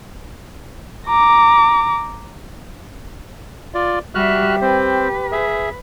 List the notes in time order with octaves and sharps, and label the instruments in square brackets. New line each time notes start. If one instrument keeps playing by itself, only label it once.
[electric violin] A#5 D6
[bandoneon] F4 D5
[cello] G3 E5 [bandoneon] F#4 F6 F#6 [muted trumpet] G4
[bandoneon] C4 C5 [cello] B4
[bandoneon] G#4 E5